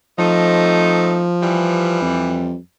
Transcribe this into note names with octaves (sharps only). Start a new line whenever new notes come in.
F3 A3 C4 D#4
E3 G3
F2